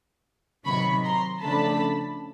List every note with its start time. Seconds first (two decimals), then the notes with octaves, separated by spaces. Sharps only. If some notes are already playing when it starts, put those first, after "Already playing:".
0.65 C3 D#3 F#3 B5 C#6
1.04 A#5 C6
1.43 C#3 F3 A3 D4 A5 B5